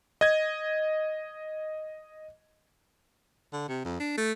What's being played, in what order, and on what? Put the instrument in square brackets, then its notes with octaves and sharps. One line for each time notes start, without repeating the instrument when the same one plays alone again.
[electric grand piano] D#5 G#6
[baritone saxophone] D3
C3
F2
D4
A3